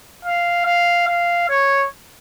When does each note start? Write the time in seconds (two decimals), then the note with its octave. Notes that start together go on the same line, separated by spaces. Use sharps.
0.25 F5
0.66 F5
1.07 F5
1.49 C#5